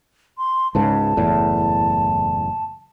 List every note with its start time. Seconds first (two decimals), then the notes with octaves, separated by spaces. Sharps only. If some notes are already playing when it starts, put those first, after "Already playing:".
0.38 C6
0.75 C#2 G#2 C#3 A5
1.17 F#1 E2 A2